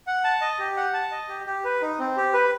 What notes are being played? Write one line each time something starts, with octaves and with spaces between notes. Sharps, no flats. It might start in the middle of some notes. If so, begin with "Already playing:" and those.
F#5
A5
D#5
G4
F#5
A5
D#5
G4
G4
B4
D#4
C4
G4
B4